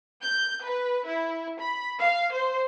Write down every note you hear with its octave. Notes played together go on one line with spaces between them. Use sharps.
G6
B4
E4
B5
F5
C5